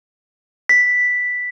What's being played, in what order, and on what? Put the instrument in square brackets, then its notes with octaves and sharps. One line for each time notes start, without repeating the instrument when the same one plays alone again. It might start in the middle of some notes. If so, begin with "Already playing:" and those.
[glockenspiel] B6